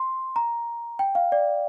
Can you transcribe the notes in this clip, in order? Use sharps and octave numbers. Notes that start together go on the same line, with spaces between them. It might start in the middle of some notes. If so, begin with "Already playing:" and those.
Already playing: C6
A#5
G5
F5
D5